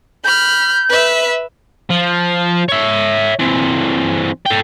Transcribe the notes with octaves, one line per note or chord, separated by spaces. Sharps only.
B5 F6 G6
B4 E5
F3
C#5 E5
E3 C4
A4 G5